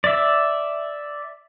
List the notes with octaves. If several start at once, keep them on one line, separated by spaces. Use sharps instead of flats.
D5 E5